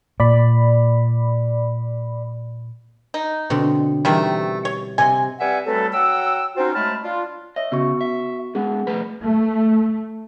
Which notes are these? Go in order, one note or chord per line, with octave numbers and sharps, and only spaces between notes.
A#2 D5 B5
D#4
B2 D3 C4
C3 D#3 E3 G3 A3
C#5
C3 D#5 G#5 C6
G3 C4 B4 E5 F#5 G#5
F#3 G3 A3 C4 A4 B4
F#3 F#5 G5 E6
C4 C#4 D#4 F4 F#4 C5
F#3 G#3 A3 A5 B5 F6
D4 F4
C#5 D#5 E5
C#3 B3 F#4 C#6
E5
G#3 B3 G#4 F#5
F3 A3 B4 B5
A3